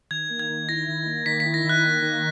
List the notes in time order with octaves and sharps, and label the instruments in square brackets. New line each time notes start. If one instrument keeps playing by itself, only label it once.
[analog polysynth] D#3 [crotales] G#6
[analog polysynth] A#3
[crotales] G#6
[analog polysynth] D#3
[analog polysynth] E4 [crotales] A#6
[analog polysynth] D#3
A#3
[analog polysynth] D#3 [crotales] B6
[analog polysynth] E4 [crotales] B6
[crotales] A#6
[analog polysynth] D#3
[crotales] F#6
[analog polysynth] A#3
D#3